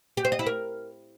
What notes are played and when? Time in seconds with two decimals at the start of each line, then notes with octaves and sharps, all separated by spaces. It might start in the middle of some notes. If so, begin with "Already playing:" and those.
0.17 G4
0.25 C5
0.32 D#5
0.39 E4
0.46 A#4